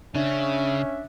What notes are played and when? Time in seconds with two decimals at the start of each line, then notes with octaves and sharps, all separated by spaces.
0.15 C#3 C#4 D4 E5